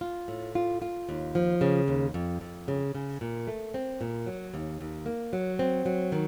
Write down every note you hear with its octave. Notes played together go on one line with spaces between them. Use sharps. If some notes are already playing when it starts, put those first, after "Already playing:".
F4
A2
F4
F4
D#2
F3
C#3
D#2
F2
F2
C#3
C#3
A#2
A3
C4
A#2
F#3
D#2
D#2
A#3
F#3
C4
F#3
D#3